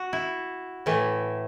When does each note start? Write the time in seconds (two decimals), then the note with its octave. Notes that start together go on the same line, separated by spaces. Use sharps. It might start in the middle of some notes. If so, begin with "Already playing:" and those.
Already playing: F#4
0.13 E4
0.86 A2 E3 A3